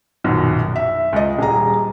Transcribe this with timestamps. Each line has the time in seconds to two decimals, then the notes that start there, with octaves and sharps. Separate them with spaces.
0.24 A#1 F#2 B2 D#3
0.76 E5
1.13 C#2 D#5
1.39 D#1 G#4 A#5